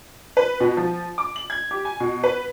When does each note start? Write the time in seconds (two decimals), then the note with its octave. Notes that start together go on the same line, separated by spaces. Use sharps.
0.37 B4
0.60 B2
0.77 F3
1.18 D6
1.36 F#7
1.50 G#6
1.71 G4
1.85 G#5
2.00 B2
2.24 B4